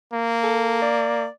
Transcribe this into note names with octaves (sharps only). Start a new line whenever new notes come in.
A#3
A4
D5